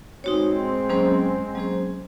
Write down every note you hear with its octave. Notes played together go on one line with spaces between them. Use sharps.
G#3 C4 D#4 F#4 C#5
F#3 A#3 C#4 G#4 C5
F#3 A#3 C#4 G#4 C5